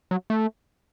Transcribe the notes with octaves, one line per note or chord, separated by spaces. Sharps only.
F#3
A3